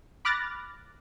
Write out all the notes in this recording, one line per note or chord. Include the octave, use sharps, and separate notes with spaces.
B5 D6 F6 F#6 A6 A#6